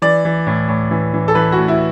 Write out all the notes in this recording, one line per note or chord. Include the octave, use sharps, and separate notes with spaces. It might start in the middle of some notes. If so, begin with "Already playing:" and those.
E3 D5
E3
A2
A2
E3
E3
A4
E3 B4
F#4
A2
E4